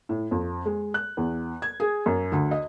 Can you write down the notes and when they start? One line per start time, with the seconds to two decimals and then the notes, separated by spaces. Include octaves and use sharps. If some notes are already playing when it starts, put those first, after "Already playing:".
0.09 A2
0.31 F2
0.66 G#3
0.94 F#6
1.17 E2
1.62 G#6
1.80 G#4
2.06 F#2
2.32 D2
2.51 D#5